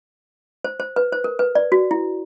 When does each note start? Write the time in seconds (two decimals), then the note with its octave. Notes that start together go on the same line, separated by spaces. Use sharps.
0.64 C5
0.80 C5
0.96 B4
1.13 C5
1.24 A#4
1.39 B4
1.55 D5
1.72 F#4
1.91 E4